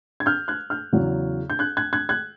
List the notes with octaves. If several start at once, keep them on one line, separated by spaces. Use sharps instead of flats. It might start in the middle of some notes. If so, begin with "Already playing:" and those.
G#6
F6 G6
F#6 G#6
F6 G6
E2 C#3 F#3
G6
F#6 G#6
F#6 G#6
F#6 G#6
F#6 G#6